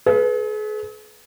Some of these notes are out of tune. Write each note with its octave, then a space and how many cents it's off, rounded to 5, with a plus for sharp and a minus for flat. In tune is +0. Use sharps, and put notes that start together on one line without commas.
G#4 +45 B4 +0